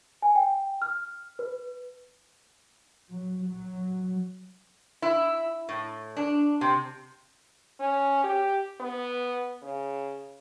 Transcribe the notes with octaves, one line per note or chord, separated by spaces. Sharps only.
G#5
G5
F6
B4
F#3
F#3
E4
A2
D4
C3
C#4
G4
B3
C#3